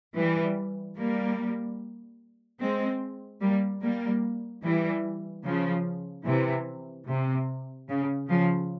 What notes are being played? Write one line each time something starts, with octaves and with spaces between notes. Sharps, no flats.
E3 G3
G3 A#3
G#3 C4
G3 A#3
G3 A#3
E3 G3
C#3 F3
C3 E3
C3
C#3
C#3 F3